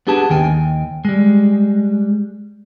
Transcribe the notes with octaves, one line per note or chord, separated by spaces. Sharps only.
B3 D4 G4 G#4 A5
D#2 D#3 G5 G#5
G3 G#3